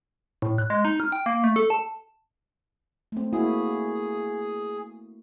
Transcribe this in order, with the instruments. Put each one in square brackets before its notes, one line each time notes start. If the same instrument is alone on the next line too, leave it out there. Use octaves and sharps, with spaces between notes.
[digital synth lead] A2
F#6
G#3
D#4
F6
G5
A#3
A3
A4
A5
[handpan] A3 C4
[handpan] A#3 E4 F#4 [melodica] G#4